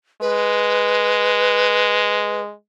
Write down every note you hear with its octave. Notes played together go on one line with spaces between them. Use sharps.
G#3 B4